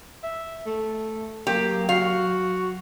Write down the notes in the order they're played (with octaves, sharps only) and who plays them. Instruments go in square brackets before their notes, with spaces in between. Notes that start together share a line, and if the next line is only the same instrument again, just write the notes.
[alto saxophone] E5
A3
[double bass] F#3 [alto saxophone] A#3 [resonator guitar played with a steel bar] G4
[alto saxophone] F#4 [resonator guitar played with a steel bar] F5